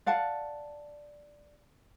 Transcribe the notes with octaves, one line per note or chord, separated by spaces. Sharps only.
D5 F5 F#5 A5